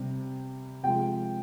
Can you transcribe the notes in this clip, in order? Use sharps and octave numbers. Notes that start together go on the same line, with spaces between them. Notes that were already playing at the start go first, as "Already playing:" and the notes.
Already playing: C3 G3
C3 F3 G#3 G5